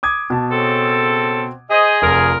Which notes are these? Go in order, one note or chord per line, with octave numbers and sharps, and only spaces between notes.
D6 D#6 G#6
B2 A5
C#3 C4 A4
G#4 C5 D#5
F1 D3 F4 A#4